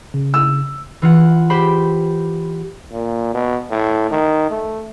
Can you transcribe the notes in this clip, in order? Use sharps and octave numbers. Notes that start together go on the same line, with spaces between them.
C#3
E6
E3 F4 F#5
G4 C5 B5
A#2
B2
A2
D#3
A3